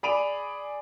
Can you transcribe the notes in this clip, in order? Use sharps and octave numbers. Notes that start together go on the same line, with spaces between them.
G#4 D5 B5 D7 D#7 F7